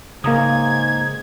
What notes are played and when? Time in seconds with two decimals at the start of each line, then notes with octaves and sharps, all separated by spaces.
0.24 G#2 C#3 A#3 A#5 D#6 G#6